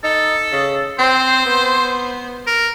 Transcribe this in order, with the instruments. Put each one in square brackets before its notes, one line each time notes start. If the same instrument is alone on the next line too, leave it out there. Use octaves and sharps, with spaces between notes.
[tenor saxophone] D#4 [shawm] A4
[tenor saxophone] C#3
[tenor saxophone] C4 [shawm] C5
[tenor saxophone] B3
[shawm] A#4